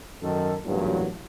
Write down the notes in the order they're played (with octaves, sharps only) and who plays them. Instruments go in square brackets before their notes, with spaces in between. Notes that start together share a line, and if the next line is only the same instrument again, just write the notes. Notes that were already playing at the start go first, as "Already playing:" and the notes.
[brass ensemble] F#2 D#3 A4
A1 E2 G2 A#2 F#3